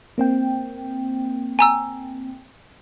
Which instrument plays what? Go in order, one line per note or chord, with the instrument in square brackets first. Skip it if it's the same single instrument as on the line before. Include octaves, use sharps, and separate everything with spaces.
[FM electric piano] A#3 C4 G5
[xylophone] G#5 A#5 E6